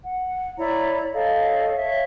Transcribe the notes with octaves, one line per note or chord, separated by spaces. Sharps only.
F#5
E4 C#5 D5 A#5
A4 C#5 D#5 F5
C#5 E5 F5